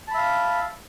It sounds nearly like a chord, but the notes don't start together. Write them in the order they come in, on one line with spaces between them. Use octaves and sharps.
A5 B5 E5 F5